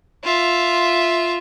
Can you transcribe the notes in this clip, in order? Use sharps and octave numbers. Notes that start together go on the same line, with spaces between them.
F4 E5